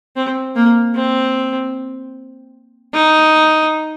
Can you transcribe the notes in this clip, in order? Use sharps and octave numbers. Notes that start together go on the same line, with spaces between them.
C4
A#3
C4
D#4